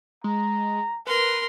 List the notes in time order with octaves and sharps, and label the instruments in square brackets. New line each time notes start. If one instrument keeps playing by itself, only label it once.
[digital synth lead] G#3 [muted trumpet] A#5
[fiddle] A#4 C6 [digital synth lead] B4